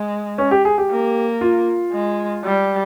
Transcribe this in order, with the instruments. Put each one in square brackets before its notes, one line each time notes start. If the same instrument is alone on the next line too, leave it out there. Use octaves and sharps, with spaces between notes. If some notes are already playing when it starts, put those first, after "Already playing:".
Already playing: [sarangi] G#3
[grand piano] C#4
G4
G#4
G4
[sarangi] A#3
[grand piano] F4
[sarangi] G#3
G3